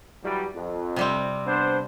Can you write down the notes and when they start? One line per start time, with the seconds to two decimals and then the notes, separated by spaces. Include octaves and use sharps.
0.24 E3 F#3 G3
0.55 F2
0.96 C3 G3 C4
1.47 B3 D4 C5